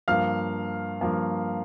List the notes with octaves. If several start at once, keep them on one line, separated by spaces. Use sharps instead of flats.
G2 F3 A#3 F5 F6
G2 F3 A#3